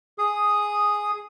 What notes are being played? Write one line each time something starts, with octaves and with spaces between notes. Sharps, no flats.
G#4 D#6